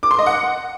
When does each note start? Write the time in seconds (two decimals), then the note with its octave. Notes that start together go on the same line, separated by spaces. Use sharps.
0.03 D6
0.11 C6
0.19 D#5
0.26 F#5